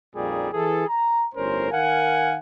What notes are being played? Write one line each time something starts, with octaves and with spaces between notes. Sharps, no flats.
A#1 F2 A#2 G3 D#4 G#4
E3 G#4 A4
A#5
G1 A2 C#4 A#4 C5
D#3 A#4 F5 F#5 G#5